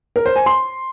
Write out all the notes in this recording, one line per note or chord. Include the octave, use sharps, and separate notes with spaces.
A#4
C5
G#5
C6